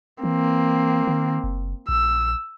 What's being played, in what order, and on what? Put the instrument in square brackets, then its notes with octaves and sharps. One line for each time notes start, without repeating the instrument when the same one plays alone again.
[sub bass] E3 [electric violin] A#3 C4
[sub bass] D#3
F#1
[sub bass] A#1 [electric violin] E6